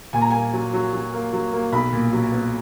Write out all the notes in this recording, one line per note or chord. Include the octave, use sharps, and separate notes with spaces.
A#2 G#5
A#5
A#3 G#5
F#3
F#3
F#3
A#3
F#3
A#3
B1 B5
A#2
F#3
B3